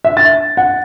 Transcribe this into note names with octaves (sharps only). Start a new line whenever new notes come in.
E5
A6
F#5